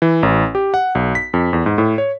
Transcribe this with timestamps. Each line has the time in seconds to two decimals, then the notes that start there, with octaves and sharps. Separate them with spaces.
0.02 E3
0.23 A1
0.55 G4
0.74 F#5
0.95 B1
1.15 B6
1.34 F2
1.53 E2
1.66 G#2
1.78 A2
1.98 C#5